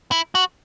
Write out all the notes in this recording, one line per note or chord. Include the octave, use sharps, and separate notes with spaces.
E4
F#4